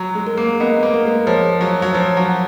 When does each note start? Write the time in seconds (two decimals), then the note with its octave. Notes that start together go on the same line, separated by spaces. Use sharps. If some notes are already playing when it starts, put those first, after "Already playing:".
Already playing: F#3 A#5
0.15 G#3
0.27 A#4
0.37 A#3
0.60 B3 D#5
0.83 A#3
0.94 A#4
1.05 G#3
1.27 F3 C#5
1.61 F#3 C#5
1.82 F#3
1.94 F3 C#5
2.17 F#3
2.28 F#5